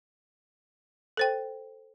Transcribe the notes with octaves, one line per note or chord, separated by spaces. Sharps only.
A4 C5 G5